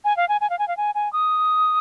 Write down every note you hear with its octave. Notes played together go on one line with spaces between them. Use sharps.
G#5
F5
G#5
G#5
F5
G#5
F5
G#5
G#5
D#6